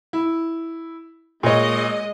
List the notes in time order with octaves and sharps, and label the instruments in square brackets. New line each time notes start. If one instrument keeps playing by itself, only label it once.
[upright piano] E4
[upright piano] A#2 C#5 [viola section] G#3 D#5